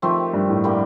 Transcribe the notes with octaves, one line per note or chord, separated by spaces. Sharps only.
D#3 F3 A3 C4 G4
G2
A2
D3 G3 A#3